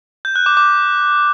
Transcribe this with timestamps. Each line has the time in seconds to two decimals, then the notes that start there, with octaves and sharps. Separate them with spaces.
0.25 G6
0.36 F#6
0.46 D6
0.57 D6